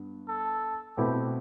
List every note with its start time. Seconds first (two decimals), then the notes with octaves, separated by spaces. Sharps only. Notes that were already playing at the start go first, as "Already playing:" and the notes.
Already playing: G2 B3
0.28 A4
0.97 B2 A3 C4 E4 G4 B4